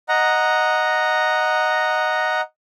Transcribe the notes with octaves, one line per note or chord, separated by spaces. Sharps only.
D#5 F#5 A#5